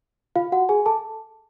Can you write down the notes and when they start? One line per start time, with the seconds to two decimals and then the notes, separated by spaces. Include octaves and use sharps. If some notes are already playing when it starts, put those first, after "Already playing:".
0.36 F4 F5
0.52 F#4 F#5
0.69 G#4 G#5
0.86 A4 A5